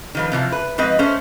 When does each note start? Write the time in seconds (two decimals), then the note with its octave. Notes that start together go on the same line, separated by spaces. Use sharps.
0.15 D#3 F3 B4
0.32 C3 E3 F3
0.52 B4
0.78 G#2 F3 C4 B4 D#5
0.99 A3 C#4 C5